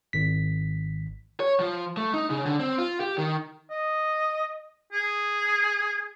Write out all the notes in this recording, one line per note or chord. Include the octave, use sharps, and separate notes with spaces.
G#1 B6
C#5
F3
A3
D#4
C#3
D3
C4
F4
G4
D#3
D#5
G#4